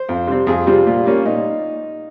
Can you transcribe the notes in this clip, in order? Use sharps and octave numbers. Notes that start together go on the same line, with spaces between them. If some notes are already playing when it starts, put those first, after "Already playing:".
Already playing: C5
F2
C3 G3 C4
F2 G#4
C3 G3 C4 F4
A#2
G3 A#3 C#4
A#2 D#4